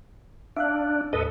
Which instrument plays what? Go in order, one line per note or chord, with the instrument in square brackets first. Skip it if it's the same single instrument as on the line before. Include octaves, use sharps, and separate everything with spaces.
[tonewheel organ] D4 [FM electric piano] E5 F5 F#6
[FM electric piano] D#2 A2 [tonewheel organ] A4 B4 D#5